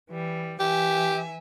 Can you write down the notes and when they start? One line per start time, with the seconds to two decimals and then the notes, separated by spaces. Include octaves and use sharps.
0.11 E3 G3
0.60 E3 G4 E5 G#5